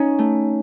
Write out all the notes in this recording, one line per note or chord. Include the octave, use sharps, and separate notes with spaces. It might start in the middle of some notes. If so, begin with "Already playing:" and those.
Already playing: C#4 D#4
A3